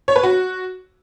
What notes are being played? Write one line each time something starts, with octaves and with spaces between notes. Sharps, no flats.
C#5
B4
F#4